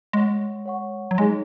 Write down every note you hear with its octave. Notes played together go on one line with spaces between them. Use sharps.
G#3 C#5 F#5 C#6
C#5 F#5 C#6
F#3
G#3 D#4 G#4 C#5 G#5